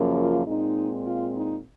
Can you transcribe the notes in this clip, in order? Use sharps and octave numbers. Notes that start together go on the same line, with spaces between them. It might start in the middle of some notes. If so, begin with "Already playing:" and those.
Already playing: F#2 C#3 F3 A#3
F4
A#2 G#3 C4 D#4
F4
D#4